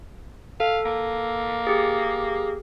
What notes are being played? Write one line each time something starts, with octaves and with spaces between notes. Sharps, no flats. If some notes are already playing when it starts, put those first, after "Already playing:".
A4 F5
A#3
G4 G#4